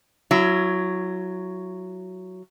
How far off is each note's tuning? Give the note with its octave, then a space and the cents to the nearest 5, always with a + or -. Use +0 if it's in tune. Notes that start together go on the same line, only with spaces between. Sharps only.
F#3 +0 E4 +30